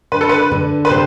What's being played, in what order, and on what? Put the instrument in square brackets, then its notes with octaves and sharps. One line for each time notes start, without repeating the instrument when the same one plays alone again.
[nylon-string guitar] D3 [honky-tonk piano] B4
[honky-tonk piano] A4
B4
[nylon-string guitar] D3
[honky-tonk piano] B4
[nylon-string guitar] C3 [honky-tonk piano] C5